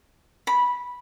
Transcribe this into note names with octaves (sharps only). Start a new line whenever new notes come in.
B5